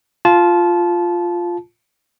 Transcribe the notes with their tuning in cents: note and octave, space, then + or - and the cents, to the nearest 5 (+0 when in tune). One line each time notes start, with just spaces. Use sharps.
F4 +0 A5 -20